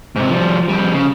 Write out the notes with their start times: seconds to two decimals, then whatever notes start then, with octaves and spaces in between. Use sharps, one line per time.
0.16 G#2 C3
0.30 F3 G3
0.69 F2 G3
0.93 C#3